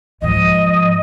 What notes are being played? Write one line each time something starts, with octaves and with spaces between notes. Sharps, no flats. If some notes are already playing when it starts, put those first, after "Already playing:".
G#2 F3 D#5